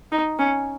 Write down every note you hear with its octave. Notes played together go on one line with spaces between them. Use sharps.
D#4
C#4